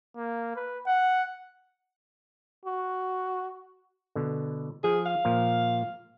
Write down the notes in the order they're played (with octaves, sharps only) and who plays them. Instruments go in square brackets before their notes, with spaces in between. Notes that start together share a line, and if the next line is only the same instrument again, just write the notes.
[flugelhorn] A#3
B4
F#5
[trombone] F#4
[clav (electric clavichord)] B2 D3
[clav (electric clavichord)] F3 [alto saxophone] G#4
[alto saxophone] F5
[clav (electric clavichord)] A#2 F3